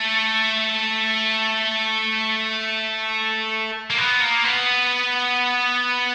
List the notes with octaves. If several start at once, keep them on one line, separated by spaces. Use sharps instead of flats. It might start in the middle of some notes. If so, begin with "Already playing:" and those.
Already playing: A3
A#3
B3
A#3
B3